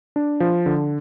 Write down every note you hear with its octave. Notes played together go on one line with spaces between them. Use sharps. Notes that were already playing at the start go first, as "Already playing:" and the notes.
D4
F3
D3